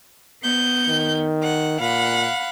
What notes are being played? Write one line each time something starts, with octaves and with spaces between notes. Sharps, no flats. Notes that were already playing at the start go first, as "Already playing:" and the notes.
B3 G6
D#3
F#5
A#2 F5 F#5 B5